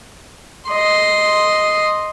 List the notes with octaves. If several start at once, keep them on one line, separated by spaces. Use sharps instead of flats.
D#5 C6